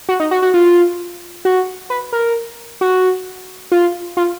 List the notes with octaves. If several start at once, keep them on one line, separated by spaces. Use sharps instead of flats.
F#4
D#4
F#4
F#4
F4
F#4
B4
A#4
F#4
F4
F4